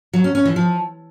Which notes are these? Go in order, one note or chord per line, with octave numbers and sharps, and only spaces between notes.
F#3
C#4
C#4
E3
F3